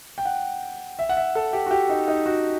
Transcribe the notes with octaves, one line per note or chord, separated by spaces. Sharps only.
G5
F#5
E5
F#5
E5
A4
G4
F#4
G4
D#4
D#4
F#4